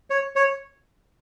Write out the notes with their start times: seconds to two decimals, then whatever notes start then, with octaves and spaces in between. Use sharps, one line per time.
0.10 C#5
0.36 C#5